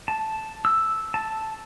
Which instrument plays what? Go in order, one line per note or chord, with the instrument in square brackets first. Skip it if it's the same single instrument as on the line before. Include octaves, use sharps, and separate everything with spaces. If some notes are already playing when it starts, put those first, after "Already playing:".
[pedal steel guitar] A5
E6
A5